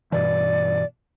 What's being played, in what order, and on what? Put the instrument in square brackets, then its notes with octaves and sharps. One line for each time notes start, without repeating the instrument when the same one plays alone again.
[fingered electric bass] G2 B2 E3 [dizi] D5